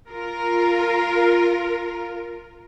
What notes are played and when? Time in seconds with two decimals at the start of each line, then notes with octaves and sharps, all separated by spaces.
0.10 F4 A#4